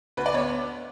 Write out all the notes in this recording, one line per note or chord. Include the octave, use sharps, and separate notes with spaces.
D2 B4
D5
B3 C#5